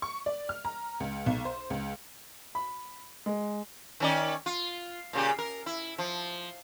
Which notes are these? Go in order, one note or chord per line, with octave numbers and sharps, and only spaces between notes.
C#6
D5
F6
A#5
C#2
B1
C5
C#2
B5
G#3
D#3 C#4 D5
F4
A#2 C#3 G4
A#4
E4
F3